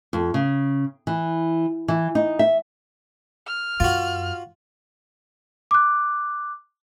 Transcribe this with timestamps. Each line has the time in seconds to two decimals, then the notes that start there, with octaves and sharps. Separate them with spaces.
0.13 F2
0.34 C#3
1.07 E3
1.88 E3
2.15 D#4
2.39 E5
3.47 F6
3.80 F#2 F4 F#4
5.71 D6 F#6